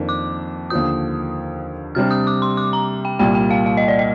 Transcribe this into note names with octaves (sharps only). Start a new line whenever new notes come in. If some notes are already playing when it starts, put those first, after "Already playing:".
Already playing: F2 D#3 A#3 D4
D6
D#2 D3 F3 D#6
C3 G3 D4 F6
D#6
D6
C6
D6
A#5
G5
C2 A#2 G3 G5
G5
F5
F5
D#5
D5
D#5